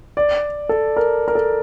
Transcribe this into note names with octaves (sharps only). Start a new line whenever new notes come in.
D5
A4
A#4
A#4
A4